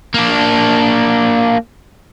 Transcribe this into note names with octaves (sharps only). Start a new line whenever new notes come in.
A#3 D4